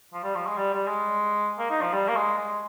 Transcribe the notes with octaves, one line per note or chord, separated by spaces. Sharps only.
F3
G3
F3
G#3
G3
G3
G#3
A#3
D#4
F3
G3
A#3
G#3
G#3